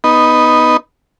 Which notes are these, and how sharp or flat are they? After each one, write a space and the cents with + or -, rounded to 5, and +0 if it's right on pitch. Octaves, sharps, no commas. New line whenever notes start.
B3 +0 D#4 +0